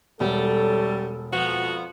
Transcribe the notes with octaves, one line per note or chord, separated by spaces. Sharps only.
E1 G3 A3 C#4 F#4 A4
F2 F3 B3 F#4